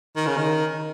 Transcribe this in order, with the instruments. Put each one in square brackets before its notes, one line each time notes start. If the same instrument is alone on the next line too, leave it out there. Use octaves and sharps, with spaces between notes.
[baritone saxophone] D#3
C#3
D#3